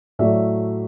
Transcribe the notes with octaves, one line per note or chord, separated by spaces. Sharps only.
A2 F#3 A3 D5 E5